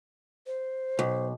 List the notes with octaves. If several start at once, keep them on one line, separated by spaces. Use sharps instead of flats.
C5
B1